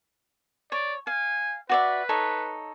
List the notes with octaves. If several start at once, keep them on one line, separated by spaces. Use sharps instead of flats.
C#5 D5
F5 G#5
F#4 B4 D5 E5
D#4 A4 C#5